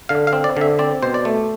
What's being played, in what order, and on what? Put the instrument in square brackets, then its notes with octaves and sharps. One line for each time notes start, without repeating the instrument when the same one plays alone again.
[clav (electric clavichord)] D3 F5
F5
C4
D5
D3 E5
C4 D5
B2 C5
D5
A3